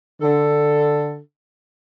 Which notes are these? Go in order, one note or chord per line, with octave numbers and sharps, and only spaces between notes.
D3 A4